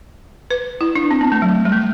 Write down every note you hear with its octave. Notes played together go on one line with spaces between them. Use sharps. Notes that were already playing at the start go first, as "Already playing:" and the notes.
B4
E4
D4
C4
B3
A3
F#3
G3
A3